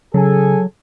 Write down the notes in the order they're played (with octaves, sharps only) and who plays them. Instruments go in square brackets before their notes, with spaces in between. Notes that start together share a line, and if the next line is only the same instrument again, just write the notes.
[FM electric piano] C#3 [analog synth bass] F#3 [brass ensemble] G#4 A4 G#5